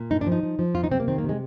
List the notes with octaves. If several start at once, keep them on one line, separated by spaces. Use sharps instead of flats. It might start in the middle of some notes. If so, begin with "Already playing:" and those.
Already playing: A#2
G2 D#4
D4
F3
D#4
F3
F3
F2 F4
D#4
C3 C4
A#3
D#3 C4
A#3
C3
G#3